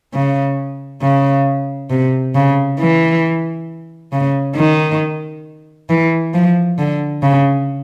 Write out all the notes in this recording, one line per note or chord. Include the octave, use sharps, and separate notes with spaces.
C#3
C#3
C3
C#3
E3
C#3
D#3
E3
F3
D3
C#3